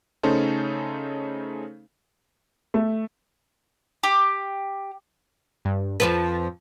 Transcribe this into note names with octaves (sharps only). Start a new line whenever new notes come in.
C#3 A3 C#4 D#4 A4 C5
A3
G4
G2
F2 F3 B4 A5